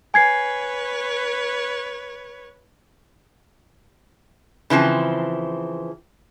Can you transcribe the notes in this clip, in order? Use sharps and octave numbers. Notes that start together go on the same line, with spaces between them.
B4 C#5 G#5 G#6 C7
C#3 E3 F3 C4